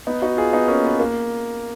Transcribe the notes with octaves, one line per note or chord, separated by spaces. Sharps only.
B3 D#4
D#4 F#4
F4 G#4
B3 D#4
A#3 C#4
B3
A#3